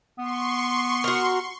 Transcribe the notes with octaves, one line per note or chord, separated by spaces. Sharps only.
B3 C6 C#6
F#4 A#4